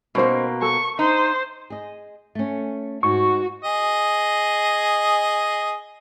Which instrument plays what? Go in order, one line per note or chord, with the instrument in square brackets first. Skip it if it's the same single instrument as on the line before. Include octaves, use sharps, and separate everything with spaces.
[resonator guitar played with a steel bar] B2 A#3 [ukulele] C#4 D#4 C5
[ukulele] A4 [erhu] C#6
[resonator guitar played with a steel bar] D#4 [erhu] C5
[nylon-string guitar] G#4 D#5
A3 C#4
[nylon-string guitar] G#2 [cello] F#4 [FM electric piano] C#6
[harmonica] G#4 D#5